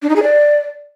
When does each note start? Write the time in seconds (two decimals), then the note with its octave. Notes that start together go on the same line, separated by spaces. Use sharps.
0.02 D4
0.09 D#4
0.16 G#4
0.23 D5